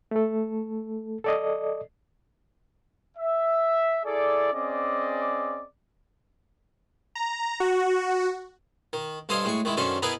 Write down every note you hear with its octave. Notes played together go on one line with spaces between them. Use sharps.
A3 A4
A4 D5 D#5
E5
E4 G#4 A4 D5
C4 C#4 G#4 D5 D#5 D6
A#5
F#4
D#3
G2 A4 C5 D#5 F5 G#5
A2 G#3 C#6
D#3 G#3 E4
F#2 D3 D#3 C#4 A4 C5
B3 D#4 E4 G#4 A#4 B4